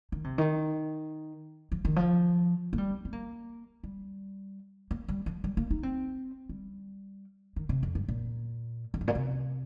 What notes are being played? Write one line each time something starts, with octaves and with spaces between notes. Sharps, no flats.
D#3
C3
D#3
F3
D#3
F3
A#3
G3
C4
A#3
G3
A#3
G3
F3
G3
A#3
D#4
C4
G3
D#3
C3
F2
G2
A#2
F2
G2
A#2
C3